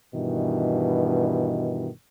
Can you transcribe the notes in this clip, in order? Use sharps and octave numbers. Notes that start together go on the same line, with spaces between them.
G2 B2 D#3 E3